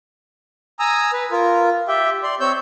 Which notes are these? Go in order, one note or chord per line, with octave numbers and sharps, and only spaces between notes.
G#5 A#5 D#6 E6
B4
F4 A#4
G4 E5 G5
D5 C6
C4 C#5 E6 G6